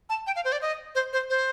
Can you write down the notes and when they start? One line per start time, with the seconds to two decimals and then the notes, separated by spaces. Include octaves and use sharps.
0.09 A5
0.27 G5
0.36 F5
0.45 C5
0.52 D5
0.62 D#5
0.95 C5
1.13 C5
1.30 C5